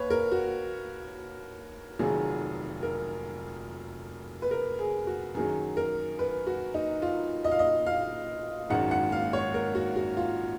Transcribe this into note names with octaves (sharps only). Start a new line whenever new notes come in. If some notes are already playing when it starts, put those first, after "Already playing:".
Already playing: D#2 B4 C#5
A#4
F#4
F1 F2 D#3 F#3 G#4
A#4
B4
A#4
G#4
F#4
F#2 D#3 F#3 G#4
A#4
B4
F#4
D#4
F4
D#5
F5
D#5
F5
G#1 F#2 D#3 G#3 F#5
F#5
F5
C#5
A#4
F#4
F#4
F4